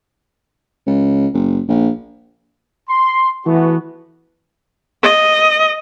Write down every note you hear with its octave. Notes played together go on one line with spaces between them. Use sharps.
C#2
F#1
A#1
C6
E3 A3 B3 F#4
D#5